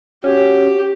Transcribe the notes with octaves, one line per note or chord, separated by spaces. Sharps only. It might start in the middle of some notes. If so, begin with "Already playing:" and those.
C#4 F#4 G4